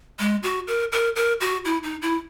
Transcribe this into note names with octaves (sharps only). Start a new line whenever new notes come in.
G#3
F#4
A#4
A#4
A#4
F#4
E4
D#4
E4